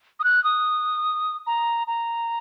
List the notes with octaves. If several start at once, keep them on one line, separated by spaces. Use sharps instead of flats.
D#6
F#6
D#6
A#5
A#5